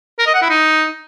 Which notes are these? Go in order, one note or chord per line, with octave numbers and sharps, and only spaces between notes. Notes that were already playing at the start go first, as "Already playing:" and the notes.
A#4
D#5
F#5
E4
D#4